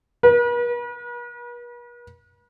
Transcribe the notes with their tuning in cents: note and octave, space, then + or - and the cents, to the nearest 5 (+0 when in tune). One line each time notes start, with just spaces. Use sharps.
B4 -45